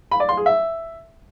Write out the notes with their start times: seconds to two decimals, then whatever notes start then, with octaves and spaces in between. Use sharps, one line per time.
0.11 B5
0.20 D5
0.29 C6
0.37 G#4
0.46 E5